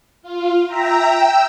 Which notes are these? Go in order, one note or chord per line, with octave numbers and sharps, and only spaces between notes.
F4
E5 G5 A#5
G5 E6